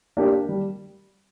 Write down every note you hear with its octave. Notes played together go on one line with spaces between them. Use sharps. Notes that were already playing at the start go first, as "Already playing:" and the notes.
A#3 D4 G4
G3